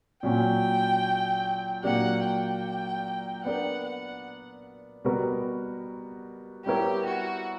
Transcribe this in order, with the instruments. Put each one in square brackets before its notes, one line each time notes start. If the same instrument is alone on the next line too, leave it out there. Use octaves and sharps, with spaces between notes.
[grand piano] A#2 F#3 C#4 [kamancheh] G5
[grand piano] A#2 F#3 A#3 D4 G4 [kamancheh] F#5
[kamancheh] G5
[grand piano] B3 D4 A#4 [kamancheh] F#5
[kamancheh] F#5
[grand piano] B2 G3 B3 F#4 A#4
[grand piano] G3 B3 E4 A#4 C#5 [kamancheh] G4
[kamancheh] F#4